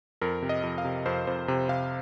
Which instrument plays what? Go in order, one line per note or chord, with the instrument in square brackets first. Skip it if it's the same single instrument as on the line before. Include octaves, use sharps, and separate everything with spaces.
[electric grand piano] F2 A#4
C3
D#5
F2
F5
C3
F2 C5
F2 C5
C3
C3 F5